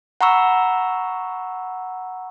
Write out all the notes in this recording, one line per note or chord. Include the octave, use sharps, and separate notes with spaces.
F#5 A#5 B5 C#6 E6